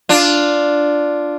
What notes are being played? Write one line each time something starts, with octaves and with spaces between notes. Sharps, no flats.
D4 F4